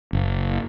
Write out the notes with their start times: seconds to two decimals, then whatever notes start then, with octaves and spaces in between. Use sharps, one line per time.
0.13 F#1